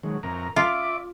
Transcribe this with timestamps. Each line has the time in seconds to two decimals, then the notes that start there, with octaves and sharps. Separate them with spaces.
0.03 D#3 F#3 G#3
0.23 F2 A#4 A#5
0.56 F4 D5 E5 D6